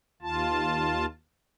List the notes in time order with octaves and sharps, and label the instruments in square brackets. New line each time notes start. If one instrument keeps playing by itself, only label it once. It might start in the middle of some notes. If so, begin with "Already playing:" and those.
[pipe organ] D#2 F4 A5